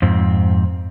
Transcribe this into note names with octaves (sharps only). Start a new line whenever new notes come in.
F2 G#2 C4